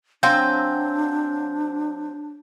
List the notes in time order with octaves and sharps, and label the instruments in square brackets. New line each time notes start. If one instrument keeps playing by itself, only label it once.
[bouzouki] F#3 C4 G#5 [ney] D4 [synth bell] F5 G5 E6 [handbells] G6